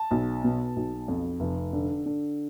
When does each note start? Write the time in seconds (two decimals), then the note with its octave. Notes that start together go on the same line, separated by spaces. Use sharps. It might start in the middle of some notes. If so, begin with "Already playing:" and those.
Already playing: A5
0.11 B1
0.44 B2
0.76 B1
1.08 F2
1.40 F1
1.73 D3
2.06 D3